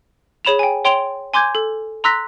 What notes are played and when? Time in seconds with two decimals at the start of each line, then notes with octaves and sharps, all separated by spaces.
0.45 G#4 C#5 B5 E7 F7
0.59 G5 G#5
0.85 C#5 G5 C6 D7 F7 G7
1.34 G#5 C6 D6 G6 G#6
1.55 A4
2.04 A#5 C6 E6 F#6 A#6 B6